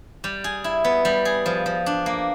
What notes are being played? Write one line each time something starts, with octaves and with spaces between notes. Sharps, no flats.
G3
G#4
E4
B3
G3
G#4
F3
F3
D4
A#3